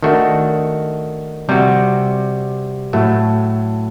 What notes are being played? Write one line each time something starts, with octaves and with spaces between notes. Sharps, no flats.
D#3 A3 D4 F#4
C3 G3 C4 F#4
A2 F#3 A3